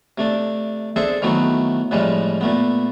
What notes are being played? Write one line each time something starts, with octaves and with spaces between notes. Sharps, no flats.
C3 A3 D4
C4 D4 G#4 A4 C5 E5
D#3 E3 F#3 A3 B3 C4
F2 A2 E3 F3 G3 G#3
A#2 A3 B3